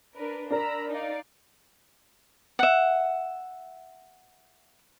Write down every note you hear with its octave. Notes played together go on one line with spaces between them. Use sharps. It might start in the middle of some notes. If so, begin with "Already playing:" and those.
D4 A#4 B4
D4 A#4 A#5 B5 E6
D#4 D5 F5
E5 F#5